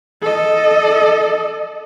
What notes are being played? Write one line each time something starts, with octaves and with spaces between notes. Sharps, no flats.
A4 D#5